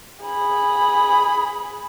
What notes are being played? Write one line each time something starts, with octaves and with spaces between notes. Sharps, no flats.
G#4 B5